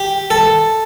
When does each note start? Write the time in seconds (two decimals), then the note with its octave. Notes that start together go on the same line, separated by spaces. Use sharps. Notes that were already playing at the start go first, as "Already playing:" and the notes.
Already playing: G4
0.30 A4